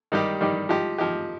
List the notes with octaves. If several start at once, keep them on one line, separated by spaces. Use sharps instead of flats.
D#3 G3 D#4 G4
D#3 G3 D#4 G4
F3 D#4 G4
F3 D#4 G4